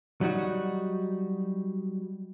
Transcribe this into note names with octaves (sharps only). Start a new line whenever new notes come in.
F#3 G3 D#4 F#4